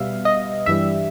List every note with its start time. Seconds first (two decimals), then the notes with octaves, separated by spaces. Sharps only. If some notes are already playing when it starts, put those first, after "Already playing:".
Already playing: B2 G3 B3 E5 F5
0.25 D#5
0.66 G2 E3 G3 E5